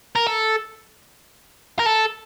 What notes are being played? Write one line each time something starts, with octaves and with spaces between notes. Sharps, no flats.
A#4
A4
A#4
A4